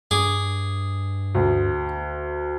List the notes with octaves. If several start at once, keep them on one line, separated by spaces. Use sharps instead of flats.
G2 G#4 D6
D2